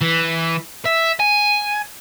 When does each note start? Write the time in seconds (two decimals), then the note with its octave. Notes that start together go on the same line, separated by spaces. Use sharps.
0.01 E3
0.86 E5
1.20 G#5